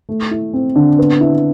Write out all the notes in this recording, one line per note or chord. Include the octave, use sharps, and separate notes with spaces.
A3
E4
C4
D3
B3
E4